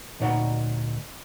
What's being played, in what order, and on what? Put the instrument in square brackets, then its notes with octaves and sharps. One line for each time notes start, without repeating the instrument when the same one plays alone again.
[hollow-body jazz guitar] D2 A#2 D#4 C#5 F#5